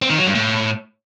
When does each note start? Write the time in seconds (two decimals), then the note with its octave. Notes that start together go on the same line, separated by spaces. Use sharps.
0.02 C4
0.10 D#3
0.18 F#3
0.27 G2
0.35 A2